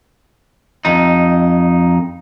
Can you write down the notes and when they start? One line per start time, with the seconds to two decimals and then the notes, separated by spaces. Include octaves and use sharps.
0.85 F2 D#4